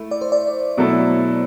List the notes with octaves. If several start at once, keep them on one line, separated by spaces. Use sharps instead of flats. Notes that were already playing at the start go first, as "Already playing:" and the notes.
Already playing: A3 E4 E5
D5
C5
D5
B2 F#3 A3 E4 A4